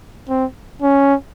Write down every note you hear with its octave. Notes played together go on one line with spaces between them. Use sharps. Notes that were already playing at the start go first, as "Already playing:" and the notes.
C4
C#4